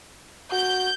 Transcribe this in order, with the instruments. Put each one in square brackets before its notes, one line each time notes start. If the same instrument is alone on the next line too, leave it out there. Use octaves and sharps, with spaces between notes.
[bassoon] F#4 [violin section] G6